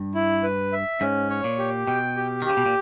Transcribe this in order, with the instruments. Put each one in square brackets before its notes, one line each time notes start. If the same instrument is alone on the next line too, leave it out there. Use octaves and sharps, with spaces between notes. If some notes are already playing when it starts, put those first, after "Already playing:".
Already playing: [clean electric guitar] G2
[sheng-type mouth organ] E4
B4
E5
[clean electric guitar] G#2 [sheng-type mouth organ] C#4
[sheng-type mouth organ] C#5
[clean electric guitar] A#2
[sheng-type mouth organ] G4
[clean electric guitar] B2 [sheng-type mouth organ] G5
[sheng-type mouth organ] G4
[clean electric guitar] D#3
[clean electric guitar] C#3 [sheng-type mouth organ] G4
[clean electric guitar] B2
A#2